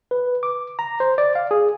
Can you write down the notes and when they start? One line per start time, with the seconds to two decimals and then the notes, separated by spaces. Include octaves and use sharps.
0.11 B4
0.43 D6
0.79 A#5
1.00 C5
1.18 D5
1.35 F5
1.51 G#4